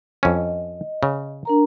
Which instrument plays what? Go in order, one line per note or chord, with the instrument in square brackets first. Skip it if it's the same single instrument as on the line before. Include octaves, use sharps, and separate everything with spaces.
[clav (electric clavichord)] F2 C#4 [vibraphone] D#5
[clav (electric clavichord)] C#3
[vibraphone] D4 A#4 A#5